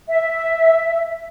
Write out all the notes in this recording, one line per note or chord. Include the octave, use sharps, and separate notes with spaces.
E5